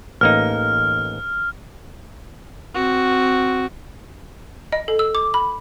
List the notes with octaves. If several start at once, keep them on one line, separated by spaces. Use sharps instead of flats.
A1 A#3 D#4 F6
C4 F#4
D#5
A4
E6
D6
B5